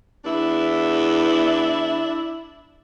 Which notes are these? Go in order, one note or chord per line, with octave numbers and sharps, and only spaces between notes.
E2 D4 E4 E5